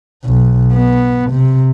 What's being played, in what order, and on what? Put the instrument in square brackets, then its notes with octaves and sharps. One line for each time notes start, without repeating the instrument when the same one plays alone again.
[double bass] B1
B3
C3